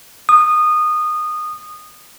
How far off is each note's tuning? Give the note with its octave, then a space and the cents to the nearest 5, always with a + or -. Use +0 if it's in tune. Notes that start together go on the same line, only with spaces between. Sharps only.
D#6 -20